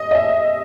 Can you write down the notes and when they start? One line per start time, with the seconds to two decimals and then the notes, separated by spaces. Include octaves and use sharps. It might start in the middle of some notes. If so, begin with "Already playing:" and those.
Already playing: D#5
0.11 D#5
0.15 E5